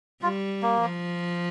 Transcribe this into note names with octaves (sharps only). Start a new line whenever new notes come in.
G3 F4
A#3
F3